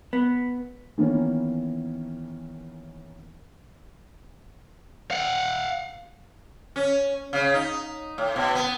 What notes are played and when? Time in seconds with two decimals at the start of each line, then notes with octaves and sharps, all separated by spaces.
0.13 B3
0.98 D#3 E3 A#3 B3 C#4
5.11 F5 F#5
6.76 C#4
7.33 C#3
7.54 D#4
8.18 A2
8.36 B2
8.55 B3